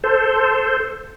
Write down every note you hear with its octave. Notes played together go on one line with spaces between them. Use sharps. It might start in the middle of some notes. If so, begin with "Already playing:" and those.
A4 C5